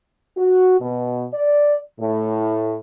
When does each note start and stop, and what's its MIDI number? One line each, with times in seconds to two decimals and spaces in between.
0.37 0.77 66
0.81 1.26 47
1.34 1.76 74
1.99 2.76 45